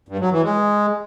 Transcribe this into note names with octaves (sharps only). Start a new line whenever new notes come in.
G2
F#3
E3
G#3